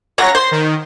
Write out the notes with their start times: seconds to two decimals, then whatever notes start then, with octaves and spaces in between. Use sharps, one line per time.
0.18 C#3 F#3 F4 C#5 F#5 A#6
0.35 C5 C6
0.51 D#3